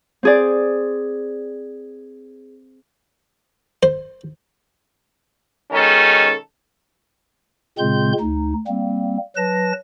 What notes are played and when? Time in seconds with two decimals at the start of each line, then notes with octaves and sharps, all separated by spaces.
0.23 C4 G#4 D5
3.83 C5
5.71 B2 D#3 G#3 C#4 A4
7.79 A#2 C#3 G#3 C4 C6 G6
8.20 D2 D#4
8.68 G3 A#3 C4
9.36 F#3 B4 A5 A#6